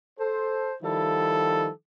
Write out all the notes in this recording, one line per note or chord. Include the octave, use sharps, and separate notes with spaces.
A4 C5
D#3 F3 G3 E4 A4